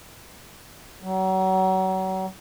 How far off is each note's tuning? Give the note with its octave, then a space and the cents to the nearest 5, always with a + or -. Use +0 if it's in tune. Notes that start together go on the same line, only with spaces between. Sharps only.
F#3 +35